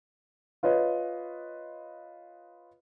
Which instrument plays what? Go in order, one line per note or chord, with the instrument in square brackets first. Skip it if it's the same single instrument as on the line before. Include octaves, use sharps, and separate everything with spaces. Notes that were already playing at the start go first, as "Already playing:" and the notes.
[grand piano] F4 B4 C#5 D#5